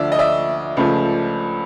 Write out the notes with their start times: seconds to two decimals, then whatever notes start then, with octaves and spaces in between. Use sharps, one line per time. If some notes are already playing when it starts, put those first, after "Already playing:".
Already playing: D2 D3 F3 D5 E5
0.12 D#5
0.19 D5 E5
0.77 C#2 C#3 F3 A3